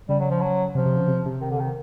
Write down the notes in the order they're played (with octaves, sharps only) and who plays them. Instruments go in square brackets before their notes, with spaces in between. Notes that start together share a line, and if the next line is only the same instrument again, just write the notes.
[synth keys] C#3 [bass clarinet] G3
[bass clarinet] F#3
F3
F#3
[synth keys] C3 [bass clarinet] F3
[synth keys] C3
C#3
C3
C3
[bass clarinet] D#3
D3
D#3